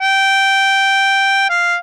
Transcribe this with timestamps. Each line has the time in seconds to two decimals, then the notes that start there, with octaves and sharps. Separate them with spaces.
0.02 G5
1.50 F5